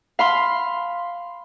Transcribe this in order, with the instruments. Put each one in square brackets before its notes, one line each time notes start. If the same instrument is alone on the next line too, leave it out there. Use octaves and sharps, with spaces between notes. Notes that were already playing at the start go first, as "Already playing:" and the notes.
[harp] F5 B5 C6